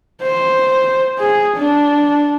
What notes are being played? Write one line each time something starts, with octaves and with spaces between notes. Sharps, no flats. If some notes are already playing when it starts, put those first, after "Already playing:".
C5
G#4
D4